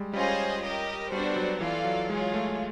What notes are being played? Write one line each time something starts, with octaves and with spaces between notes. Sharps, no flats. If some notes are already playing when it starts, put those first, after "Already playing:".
Already playing: G3 G#3
G3 C#4 F4 G#4 C5 D#5
G4 A#4 D#5
G3 B3 D4 F#4 A4 C5
F#3
E3 F4 A4 D5 F5
F#3
G#3 F4 G#4 C#5
A3